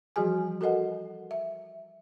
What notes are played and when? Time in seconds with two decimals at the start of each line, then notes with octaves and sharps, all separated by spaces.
0.16 E3 F3 G3 F#4 G#4 G#5
0.61 F#4 A4 A#4 D#5 F#5
1.31 E5